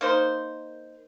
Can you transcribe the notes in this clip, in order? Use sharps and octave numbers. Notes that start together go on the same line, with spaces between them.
A#3 D#4 C5